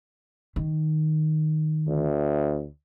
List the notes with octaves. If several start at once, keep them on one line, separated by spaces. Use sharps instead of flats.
D#3
D2